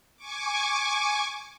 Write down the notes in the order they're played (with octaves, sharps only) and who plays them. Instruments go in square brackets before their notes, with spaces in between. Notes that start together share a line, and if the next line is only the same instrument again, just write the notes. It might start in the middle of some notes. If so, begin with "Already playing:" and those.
[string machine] G#5 C#6 D6